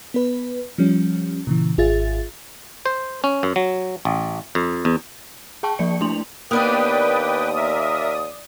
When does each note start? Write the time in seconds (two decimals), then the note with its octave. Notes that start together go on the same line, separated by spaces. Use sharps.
0.14 B3 B4
0.78 F3 G3 C#4
1.47 A#2 C#3 E3
1.78 G#1 F4 G#4 E5 A6
2.86 C5
3.24 C#4
3.43 F#2
3.56 F#3
4.05 A1
4.55 F2
4.85 E2
5.63 G#4 G5 A5 C#6
5.79 F3 A#3 D5 C#7
6.01 A3 D4 E4 C6 F7 F#7
6.51 D#2 A#3 B3 D4 B4 D5 G5 D#6
7.56 A#4 E5